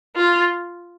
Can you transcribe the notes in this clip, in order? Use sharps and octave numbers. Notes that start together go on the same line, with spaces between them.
F4